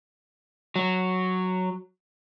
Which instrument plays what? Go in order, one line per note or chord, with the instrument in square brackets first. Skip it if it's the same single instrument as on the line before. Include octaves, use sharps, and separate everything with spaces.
[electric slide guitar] F#3